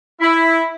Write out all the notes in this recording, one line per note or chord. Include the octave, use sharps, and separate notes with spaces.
E4